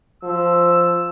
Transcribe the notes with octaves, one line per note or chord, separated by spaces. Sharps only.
F3 E6